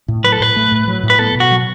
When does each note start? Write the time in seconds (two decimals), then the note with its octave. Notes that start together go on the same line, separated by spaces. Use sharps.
0.08 A2
0.24 F#3 B4
0.32 A4
0.40 A2 B4
0.56 A3
0.72 A2
0.88 F#3
1.03 A2
1.10 B4
1.19 B3 A4
1.35 B2
1.40 F#4
1.51 F#3